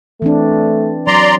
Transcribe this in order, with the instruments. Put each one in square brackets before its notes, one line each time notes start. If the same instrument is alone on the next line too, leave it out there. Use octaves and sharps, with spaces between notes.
[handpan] E3 C4 D4 [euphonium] A3
[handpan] F#3 [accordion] D5 A#5 C6